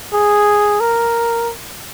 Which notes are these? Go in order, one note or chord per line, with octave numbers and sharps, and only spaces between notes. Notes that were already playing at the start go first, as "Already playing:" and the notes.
G#4
A#4